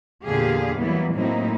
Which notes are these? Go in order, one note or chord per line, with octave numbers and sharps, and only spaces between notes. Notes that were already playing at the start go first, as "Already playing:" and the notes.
E2 A#2 D3 G4 G#4 F5
E3 F#3 G3 A#3 B3 E4
A2 F#3 A#3 C4 D#4 E4